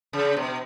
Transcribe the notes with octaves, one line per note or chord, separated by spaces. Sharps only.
C#3
B2